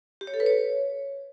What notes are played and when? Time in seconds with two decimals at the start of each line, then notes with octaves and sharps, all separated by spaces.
0.21 G4
0.27 C#5
0.34 A4
0.40 B4
0.46 C#5